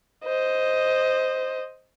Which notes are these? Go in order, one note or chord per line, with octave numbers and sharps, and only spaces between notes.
C5 D#5